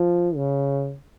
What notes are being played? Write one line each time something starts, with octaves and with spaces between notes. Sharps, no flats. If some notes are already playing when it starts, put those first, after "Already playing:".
Already playing: F3
C#3